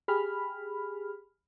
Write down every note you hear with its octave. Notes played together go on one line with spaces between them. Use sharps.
G4 G#4 B5 F6